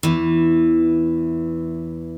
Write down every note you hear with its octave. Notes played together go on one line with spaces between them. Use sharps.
E2 E3